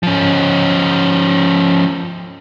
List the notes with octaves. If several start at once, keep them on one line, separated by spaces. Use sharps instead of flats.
F3 C#4